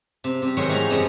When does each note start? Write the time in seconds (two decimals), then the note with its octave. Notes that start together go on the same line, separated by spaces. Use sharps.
0.24 C3
0.42 C3 G3
0.57 G#2 D#3 F#3 G3 C#5 C6
0.68 E3 A3 D#4 G4 G#4 A#5
0.90 F#2 C3 G3 G#3 B3 C#4